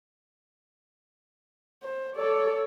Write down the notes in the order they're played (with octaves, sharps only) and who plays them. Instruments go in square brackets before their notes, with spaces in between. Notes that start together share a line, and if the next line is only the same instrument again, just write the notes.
[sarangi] C5
[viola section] A4 D5 [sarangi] C#5